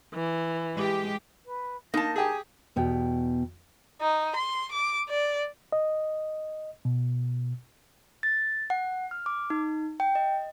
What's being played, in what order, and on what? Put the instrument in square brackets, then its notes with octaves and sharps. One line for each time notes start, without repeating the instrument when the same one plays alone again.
[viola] E3
[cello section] G#3 G4
[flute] B4
[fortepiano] A#3 [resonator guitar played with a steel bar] D#4 A5 [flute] A#6
[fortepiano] G4 G#4 [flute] G#5
[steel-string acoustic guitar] E2 B2 G5
[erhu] D#4
C6
D6
D5
[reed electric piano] D#5
B2
[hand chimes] A6
F#5
F6
D6
D#4
G5
D#5